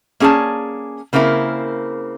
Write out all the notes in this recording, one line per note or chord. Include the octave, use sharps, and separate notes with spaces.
A#3 C#4 G#4 D5 A5
C#3 A#3 C4 E4 A#4